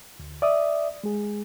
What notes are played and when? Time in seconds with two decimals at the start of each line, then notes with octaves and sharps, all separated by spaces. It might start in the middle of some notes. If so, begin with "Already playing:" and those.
0.19 D2
0.42 D5 E5 D#6
1.04 G#3 G#4